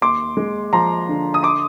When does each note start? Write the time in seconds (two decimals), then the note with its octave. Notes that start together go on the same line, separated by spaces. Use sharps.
0.01 D#2 C6 D6
0.37 G#3
0.73 F3 A#5 C6
1.09 D3
1.34 D#6
1.43 C6 D6